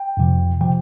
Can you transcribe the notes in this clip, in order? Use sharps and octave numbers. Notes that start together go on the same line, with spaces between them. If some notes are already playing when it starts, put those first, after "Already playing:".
Already playing: G5
F2 C3 F3
C3 F3 G5